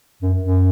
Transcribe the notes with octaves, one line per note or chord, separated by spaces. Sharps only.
F#2
F#2